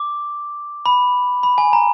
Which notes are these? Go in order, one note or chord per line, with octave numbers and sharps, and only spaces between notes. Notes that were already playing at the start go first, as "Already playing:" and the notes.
Already playing: D6
B5
B5
G#5
A#5